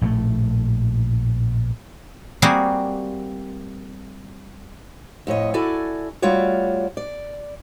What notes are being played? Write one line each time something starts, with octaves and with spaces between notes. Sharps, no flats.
A#1 A2 D#3 A3
G3 A#3 C4 F#4 G#4 C5
F2 A2 C#5 D#5
E4 F#4 A4 D5 G#5
G3 A3 F4 F#4 C#5 D5
D5